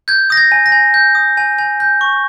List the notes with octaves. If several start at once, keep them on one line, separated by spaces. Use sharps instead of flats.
G6 G#6
D#6 A#6
G#6
G#5
A#6
G#5
G6
D#6
G#5
G#5
G6
C#6